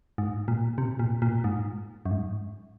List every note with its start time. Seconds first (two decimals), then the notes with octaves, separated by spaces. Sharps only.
0.18 G#2
0.48 A#2
0.78 C3
0.99 A#2
1.22 A#2
1.44 G#2
2.06 F#2
2.11 G#2